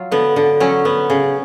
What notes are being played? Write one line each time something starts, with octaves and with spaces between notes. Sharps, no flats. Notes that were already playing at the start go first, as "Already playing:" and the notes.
Already playing: F#3 F4
D3 B3
D3
F#3 C#4
B3
C#3